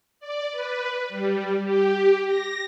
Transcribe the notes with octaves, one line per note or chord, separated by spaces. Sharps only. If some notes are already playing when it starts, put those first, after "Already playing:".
D5
B4
G3
G4
A#6